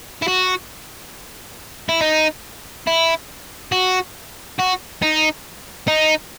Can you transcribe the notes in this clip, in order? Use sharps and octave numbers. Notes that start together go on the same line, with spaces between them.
E4
F#4
E4
D#4
E4
F#4
F#4
D#4
D#4